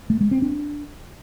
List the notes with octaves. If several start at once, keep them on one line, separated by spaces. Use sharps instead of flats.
A3
G#3
C4
D4